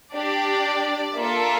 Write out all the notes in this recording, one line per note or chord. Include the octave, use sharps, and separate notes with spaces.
D4 G4 D5
A#3 D4 F4 A4 E5